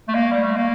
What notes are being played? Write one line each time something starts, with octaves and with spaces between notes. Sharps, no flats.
A3
A#3
G3
A3
A#3